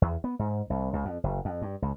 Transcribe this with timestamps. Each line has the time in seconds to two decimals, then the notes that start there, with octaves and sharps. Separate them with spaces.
0.02 E2
0.24 B3
0.39 G#2
0.70 C2
0.93 C#2
1.05 F2
1.24 F#1
1.45 F2
1.62 G2
1.82 C#2